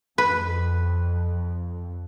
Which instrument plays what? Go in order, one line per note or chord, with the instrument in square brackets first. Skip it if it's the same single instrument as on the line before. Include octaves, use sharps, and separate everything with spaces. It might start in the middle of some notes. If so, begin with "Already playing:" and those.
[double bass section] F2 [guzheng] B4